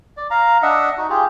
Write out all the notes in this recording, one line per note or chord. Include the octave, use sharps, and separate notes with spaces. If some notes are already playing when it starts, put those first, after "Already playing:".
D5
F5 A#5
D4 D#5 E5 F#5
D#4 F#4
F4 G4 G#4